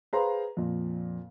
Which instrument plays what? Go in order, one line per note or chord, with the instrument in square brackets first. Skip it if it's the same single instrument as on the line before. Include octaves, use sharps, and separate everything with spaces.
[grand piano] G#4 B4 C5 F5 A#5 C6
F2 A#2